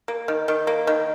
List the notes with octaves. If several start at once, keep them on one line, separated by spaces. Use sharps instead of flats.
A#3
D#3
D#3
A#3
D#3